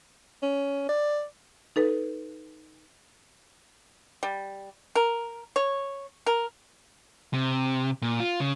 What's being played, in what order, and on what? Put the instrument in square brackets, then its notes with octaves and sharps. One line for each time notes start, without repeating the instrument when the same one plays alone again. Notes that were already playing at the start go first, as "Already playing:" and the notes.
[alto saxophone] C#4
D5
[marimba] D#4 A4 B4
[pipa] G3
A#4
C#5
A#4
[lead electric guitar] C3
A#2
F4
C#3